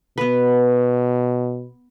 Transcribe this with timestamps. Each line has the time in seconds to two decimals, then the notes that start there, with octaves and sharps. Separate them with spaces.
0.18 B2 B3 B4